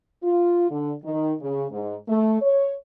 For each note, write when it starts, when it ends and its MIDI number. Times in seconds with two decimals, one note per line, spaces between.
0.23 0.67 65
0.69 0.92 50
1.04 1.33 51
1.41 1.66 49
1.71 1.95 44
2.08 2.40 57
2.41 2.73 73